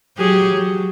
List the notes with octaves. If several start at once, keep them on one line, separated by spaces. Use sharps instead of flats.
F#3 G4 G#4
F#3